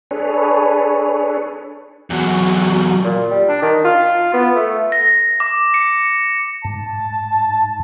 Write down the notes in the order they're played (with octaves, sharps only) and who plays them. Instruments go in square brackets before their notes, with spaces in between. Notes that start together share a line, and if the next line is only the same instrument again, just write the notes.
[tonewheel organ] D4 G#4 A4 B4 C#5
[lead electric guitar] E2 F#3
[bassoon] A#2
G3
D4
D#3
F4
B3
A3
[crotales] A#6
D6
C#7
[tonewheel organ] G#2 [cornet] A5